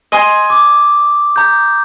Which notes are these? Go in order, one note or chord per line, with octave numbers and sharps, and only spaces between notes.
D#5 G#5 C6 D#6
D6
A#5 G6